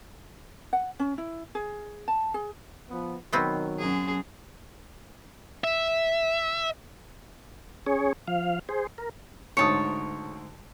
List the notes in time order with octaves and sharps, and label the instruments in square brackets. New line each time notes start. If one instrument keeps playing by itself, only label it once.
[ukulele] F#5
C#4
E4
G#4
A5
G#4
[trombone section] F3 B3
[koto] B2 B3 C4 [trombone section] D#3 F#3
[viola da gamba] F#2 G#4
[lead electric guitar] E5
[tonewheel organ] C#4 G#4 C#5
F3 F5
G#4 C5
A#4
[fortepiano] D2 G#2 D#6 [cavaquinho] C#5 A5